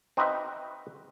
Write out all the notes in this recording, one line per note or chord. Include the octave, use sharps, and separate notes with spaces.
C4 D#4 F#4 B4 D#5 E5